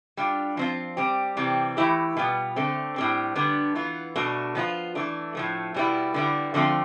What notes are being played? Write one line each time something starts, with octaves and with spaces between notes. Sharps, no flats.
G3 D4 F4
F3 C4 F4
G3 C4 G4
C3 E3 G3 C4
E3 A3 E4 G4
B2 G3 B3 F4
D3 A3 C4
A2 G3 C4
D3 G3 B3 D4
E3 B3 F4
B2 A3 D4
F3 B3 D4 F4
E3 A3 D4
A2 F3 A3
B2 G3 B3 E4
D3 G3 B3 E4
D3 F3 A3 C4 F4